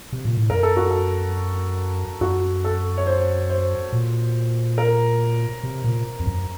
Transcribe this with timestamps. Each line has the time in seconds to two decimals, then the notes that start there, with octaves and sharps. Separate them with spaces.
0.12 C3
0.25 A#2
0.37 A2
0.50 F#2 A#4
0.63 A4
0.77 F#4
0.90 A4
2.21 F#2 F#4
2.64 A4
2.98 C#5
3.07 C5
3.50 C5
3.92 A#2
4.78 A#4
5.63 C3
5.84 A#2
6.20 F2
6.27 F#2